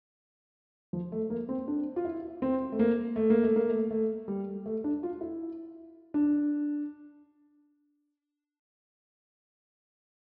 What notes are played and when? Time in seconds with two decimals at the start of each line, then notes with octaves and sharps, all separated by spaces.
0.93 F3
1.12 A3
1.30 A#3
1.49 C4
1.68 D4
1.96 F4
2.05 E4
2.42 C4
2.72 A3
2.79 A#3
3.16 A3
3.30 A#3
3.43 A3
3.56 A#3
3.70 A3
3.91 A3
4.28 G3
4.66 A3
4.84 D4
5.03 F4
5.21 E4
6.14 D4